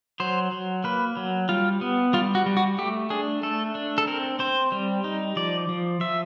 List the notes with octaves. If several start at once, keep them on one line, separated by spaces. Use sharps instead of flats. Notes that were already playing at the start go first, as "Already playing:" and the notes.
F#3 C5
F#3
A#3 B4
F#3
G3 F4
B3
G3 F4
F#4
G3
F#4
A3 G4
D4 G#4
A3 A4
D4
A4
C4 A#4
C4 C5
G3
D#4
F3 D5
F3
F3 E5